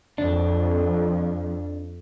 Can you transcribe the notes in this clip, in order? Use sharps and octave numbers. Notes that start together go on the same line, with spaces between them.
F2 D4